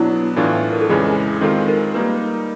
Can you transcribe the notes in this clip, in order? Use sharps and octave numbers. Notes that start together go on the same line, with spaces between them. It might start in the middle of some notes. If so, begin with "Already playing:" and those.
Already playing: B2 F#3 B3 D4 E4
A2 E3 A3 D4 F4
A#4
A4
F2 C#3 E3 G#3 G#4
D#3 G#3 C4 F4 A4
A#4
G3 A#3 D#4 B4